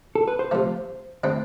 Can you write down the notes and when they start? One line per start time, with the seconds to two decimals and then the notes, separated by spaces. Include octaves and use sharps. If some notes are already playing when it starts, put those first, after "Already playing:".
0.15 A4
0.28 B4
0.39 C5
0.51 C3 F3 A3
1.24 D3 A3 C4 E4